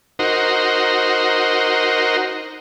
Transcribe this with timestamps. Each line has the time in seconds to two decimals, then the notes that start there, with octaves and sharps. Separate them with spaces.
0.19 D#4 F#4 A#4 C5